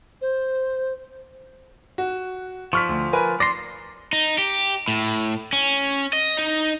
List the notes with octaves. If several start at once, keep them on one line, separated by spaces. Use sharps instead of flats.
C5
F#4
F3 C#6 F6 B6
D2
A#4 B4 G#5
D5 C6 A#6
D#4
G4
A2
C#4
D#5
D#4